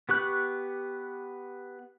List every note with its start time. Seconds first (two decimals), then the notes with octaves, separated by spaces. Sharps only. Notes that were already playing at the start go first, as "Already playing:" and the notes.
0.09 B3 G4 C#6 F#6